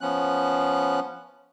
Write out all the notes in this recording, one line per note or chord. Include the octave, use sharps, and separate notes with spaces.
F3 B3 C#4 F#6